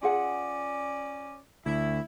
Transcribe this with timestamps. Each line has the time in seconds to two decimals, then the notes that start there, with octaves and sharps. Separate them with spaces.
0.03 C#4 F4 G#4 D5 F#5
1.66 D2 E4